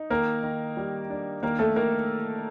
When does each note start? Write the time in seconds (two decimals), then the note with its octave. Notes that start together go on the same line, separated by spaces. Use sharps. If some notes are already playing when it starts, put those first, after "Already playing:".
Already playing: D#4
0.10 D#3 A#3 A#4
0.43 D#3
0.77 G3
1.10 D4
1.43 D#3 A#3 A#4
1.59 A3 A4
1.76 D#3 A#3 A#4